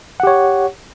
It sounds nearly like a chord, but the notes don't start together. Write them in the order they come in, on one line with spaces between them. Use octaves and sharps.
F#5 G4 C#5